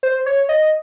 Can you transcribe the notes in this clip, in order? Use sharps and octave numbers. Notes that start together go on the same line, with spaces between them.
C5
C#5
D#5